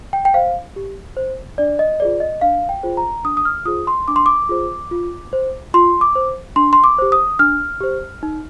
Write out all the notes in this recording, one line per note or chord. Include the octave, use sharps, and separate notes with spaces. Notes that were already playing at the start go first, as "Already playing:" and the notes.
G5
G5
C5 F5
G4
C5
D4 D5
D#5
F4 G#4 C5 D5
D#5
D4 F5
G5
F4 G#4 C5
A#5
D4 D#6
D#6
F6
F4 G#4 C5 D#6
C6
D4 D6
C6
D6
F4 G#4 C5
F4
C5
F4 C6
D6
C5
D4 C6
C6
D6
G4 C5
D#6
D4 F6
G4 C5
D#4